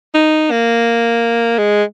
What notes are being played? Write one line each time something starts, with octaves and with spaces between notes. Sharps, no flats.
D#4
A#3
G#3